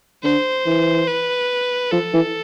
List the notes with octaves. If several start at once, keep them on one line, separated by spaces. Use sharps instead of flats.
D3 C5
E3
B4
F3 A4
E3